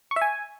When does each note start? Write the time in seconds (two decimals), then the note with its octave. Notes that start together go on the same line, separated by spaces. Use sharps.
0.11 C#6
0.16 E5
0.21 G#5